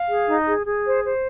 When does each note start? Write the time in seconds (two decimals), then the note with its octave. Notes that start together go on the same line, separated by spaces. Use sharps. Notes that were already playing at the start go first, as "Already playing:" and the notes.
Already playing: F5
0.09 G#4
0.28 D#4
0.47 G#4
0.66 G#4
0.85 C5
1.03 C5